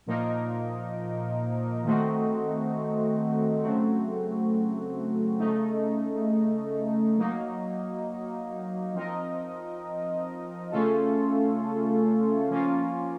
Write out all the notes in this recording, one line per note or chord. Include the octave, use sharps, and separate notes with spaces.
A#2 F3 A#3 D#4 A#4
D#3 A3 C4 D#4 F#4
C#3 F#3 A3 C4 F#4
C#3 A3 D#4
F#3 A#3 D#4
F3 C4 D#4 A#4 D#5
C#3 A3 C#4 F4 A4
F3 A#3 C#4 F4